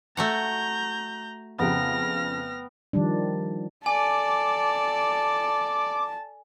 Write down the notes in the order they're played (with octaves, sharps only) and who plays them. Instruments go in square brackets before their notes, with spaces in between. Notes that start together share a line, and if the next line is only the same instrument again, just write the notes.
[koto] A3 F#4 F#5 [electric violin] A#5 G6
[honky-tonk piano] F2 C#3 [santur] B3 G5 A#5 [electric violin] F6 A#6
[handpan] D#3 F3 G3 D4
[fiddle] A4 D5 [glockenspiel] G#5 [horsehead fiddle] A5 [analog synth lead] D6